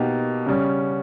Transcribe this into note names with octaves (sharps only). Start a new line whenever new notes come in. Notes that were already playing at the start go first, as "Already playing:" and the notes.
Already playing: B2 A#3 D#4 G4
C#3 G3 C#4